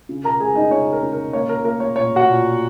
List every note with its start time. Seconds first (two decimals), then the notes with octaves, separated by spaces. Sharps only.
0.09 C#3
0.24 A#4 A#5
0.40 G#3 G#4 G#5
0.56 D#4 D#5
0.71 C#3 C#5
0.92 A#4
1.02 C#3
1.13 A#4
1.33 A#3 C#5
1.49 A#4
1.64 A#3 A#4
1.80 C#5
1.96 A#2 C#5
2.16 F#4 F#5
2.26 A#2